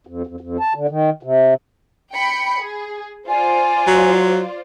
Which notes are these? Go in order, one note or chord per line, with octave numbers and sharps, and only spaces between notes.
F2
F2
F2
A5
D3
D#3
C3
G5 B5 C#7
G#4
F4 C5 D5 G#5
F#3